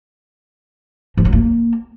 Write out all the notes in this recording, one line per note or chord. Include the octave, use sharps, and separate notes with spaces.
F3
F#3
A#3